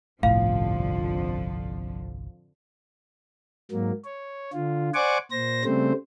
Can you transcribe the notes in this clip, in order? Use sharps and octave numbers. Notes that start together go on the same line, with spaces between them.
G1 C2 F2 A2 D3 F3 F5
G#2 F#3 A#3
C#5
D3 F4
C5 D5 F#5 G#5 C#6 D6
A#2 C5 A#6
C#3 G3 A3 C4 C5